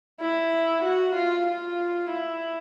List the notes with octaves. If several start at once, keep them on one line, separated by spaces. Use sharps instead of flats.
E4
F#4
F4
F4
E4